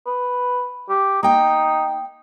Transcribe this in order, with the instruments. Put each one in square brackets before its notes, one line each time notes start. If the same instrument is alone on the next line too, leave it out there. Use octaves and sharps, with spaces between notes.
[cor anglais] B4
G4
[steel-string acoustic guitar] A#3 G5 [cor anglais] D#4